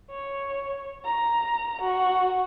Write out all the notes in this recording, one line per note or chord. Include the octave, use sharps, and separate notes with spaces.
C#5
A#5
F#4